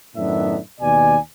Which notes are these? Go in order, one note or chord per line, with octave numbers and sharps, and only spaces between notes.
F#2 A2 D#3 B3 D4 E5
D#2 B2 D5 G#5